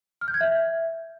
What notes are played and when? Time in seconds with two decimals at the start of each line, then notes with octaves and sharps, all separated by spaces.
0.21 F6
0.28 G6
0.34 G#6
0.41 E5